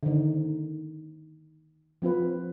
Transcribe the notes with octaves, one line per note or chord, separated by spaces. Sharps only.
D3 D#3
F3 C4 F4 B4